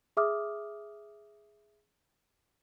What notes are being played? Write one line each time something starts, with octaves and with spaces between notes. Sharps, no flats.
G#4 E5 D6 D#6 F6